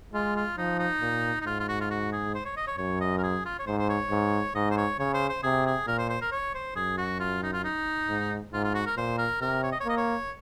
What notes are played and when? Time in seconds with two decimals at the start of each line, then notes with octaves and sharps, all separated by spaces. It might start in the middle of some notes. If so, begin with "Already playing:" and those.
0.13 G#3 F4
0.36 F4
0.57 F3 D#4
0.79 D#4
1.01 A#2
1.41 D#4
1.46 G#2 F4
1.60 F4
1.69 F#4
1.81 F4
1.90 F#4
2.13 G#4
2.35 C5
2.46 C#5
2.57 D#5
2.68 C#5
2.78 F#2 C#5
3.01 D#5
3.18 A#4
3.23 G#4
3.45 F4
3.59 C#5
3.67 G#2 C5
3.79 C5
3.90 C#5
4.10 G#2
4.55 G#2 D#5
4.71 C5
4.77 C#5
4.99 C#3 C#5
5.14 C5
5.29 C5
5.43 C3 G#4
5.66 G#4
5.87 A#2 A#4
5.98 C5
6.10 C5
6.21 A#4
6.32 C#5
6.54 C5
6.76 F#2 G#4
6.98 F#4
7.20 F4
7.43 D#4
7.53 F4
7.64 D#4
8.08 G#2
8.53 G#2 F4
8.64 F4
8.75 F#4
8.86 A#4
8.96 A#2 C5
9.18 A#4
9.41 C3 A#4
9.63 C#5
9.72 D#5
9.81 C#5
9.85 A#3 D#5
9.98 C#5